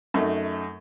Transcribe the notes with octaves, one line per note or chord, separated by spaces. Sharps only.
F#2 A3 D#4